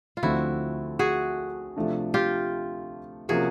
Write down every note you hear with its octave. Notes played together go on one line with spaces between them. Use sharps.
F4
D2 D3 F3 A3 C4 E4 F#4
F#4 G#4
C3 F3 A3 D4
F4 G4
C3 F3 A#3 C#4 F#4 G#4